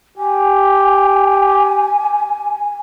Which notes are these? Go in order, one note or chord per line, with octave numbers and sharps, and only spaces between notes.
G4 G#5